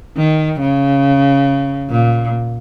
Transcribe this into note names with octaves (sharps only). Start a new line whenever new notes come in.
D#3
C#3
A#2